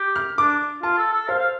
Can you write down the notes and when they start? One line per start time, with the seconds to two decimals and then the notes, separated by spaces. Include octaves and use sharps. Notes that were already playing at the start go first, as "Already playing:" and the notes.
Already playing: G4
0.16 F6
0.37 D4 D6
0.83 F4 A5
0.98 A4
1.13 A4
1.28 C5 F5
1.39 F5